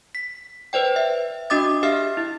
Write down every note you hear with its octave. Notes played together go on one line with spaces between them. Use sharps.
B6
B4 C5 D5 G5
E5
D4 F#4 D#5 D6 D#6 A6
G4 E5 F5 F6
E4